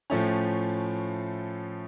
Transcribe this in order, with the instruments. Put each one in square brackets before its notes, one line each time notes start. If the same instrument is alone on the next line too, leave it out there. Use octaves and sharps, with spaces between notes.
[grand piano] A2 F3 A3 C#4